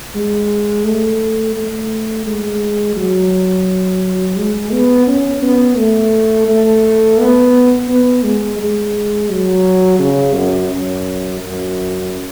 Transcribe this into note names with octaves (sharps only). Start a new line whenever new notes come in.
G#3
A3
A3
G#3
F#3
G#3
B3
C#4
B3
A3
A3
B3
B3
G#3
G#3
F#3
C#3
F#2
F#2
F#2